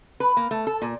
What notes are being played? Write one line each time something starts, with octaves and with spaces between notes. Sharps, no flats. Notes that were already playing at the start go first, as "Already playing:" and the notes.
B4
A#3
A3
A4
A#2